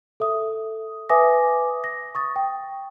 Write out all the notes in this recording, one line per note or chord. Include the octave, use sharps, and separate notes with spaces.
A4 E5 D#6
B4 E5 G#5 D6 D#6 A#6
A#6
C#6 D#6 A6
G5